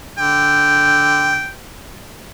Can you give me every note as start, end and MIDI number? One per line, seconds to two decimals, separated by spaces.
0.18 1.50 50
0.18 1.50 79